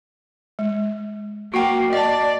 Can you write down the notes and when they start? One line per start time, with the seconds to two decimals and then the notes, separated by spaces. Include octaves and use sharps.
0.59 G#3
1.54 A#3 F#4 F#5 G5
1.93 D5 D#5 A5